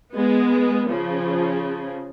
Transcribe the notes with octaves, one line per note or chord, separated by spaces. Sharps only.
G#3 B3
C#3 F3